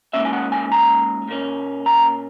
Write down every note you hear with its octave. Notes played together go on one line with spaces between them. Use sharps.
G#2 D#3 A#3 C#4 E5
G#5
F#5
G#5
A#5
A#2 A#3 C#4
A#5